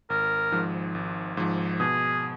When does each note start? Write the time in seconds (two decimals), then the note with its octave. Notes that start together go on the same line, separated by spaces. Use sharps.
0.10 G#1 A#4
0.52 G#2 F3
0.95 G#1
1.37 G#2 F3
1.80 B2 G#4